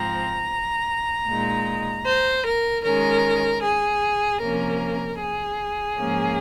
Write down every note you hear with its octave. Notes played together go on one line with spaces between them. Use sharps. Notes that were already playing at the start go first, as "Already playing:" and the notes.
Already playing: G#2 F3 C4 A#5
A#2 G#3 D#4
C5
A#4
D#3 G#3 C#4 A#4
G#4
C3 F3 A#3 C#4 A#4
G#4
G#2 F3 A#3 C#4